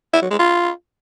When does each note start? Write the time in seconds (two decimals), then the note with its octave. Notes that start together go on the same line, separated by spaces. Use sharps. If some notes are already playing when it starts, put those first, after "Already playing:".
0.13 E4
0.22 F#3
0.30 G#3
0.39 F4